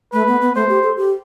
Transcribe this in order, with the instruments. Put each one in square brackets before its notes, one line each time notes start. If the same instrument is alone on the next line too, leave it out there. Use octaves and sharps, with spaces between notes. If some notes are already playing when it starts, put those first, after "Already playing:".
[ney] A3 [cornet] B4
[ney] B3
B3
[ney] A3 [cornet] C5
[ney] G4
A4
G4